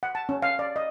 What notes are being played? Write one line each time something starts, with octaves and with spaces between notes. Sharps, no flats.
F#5
A5
C#4
F5
D5
D#5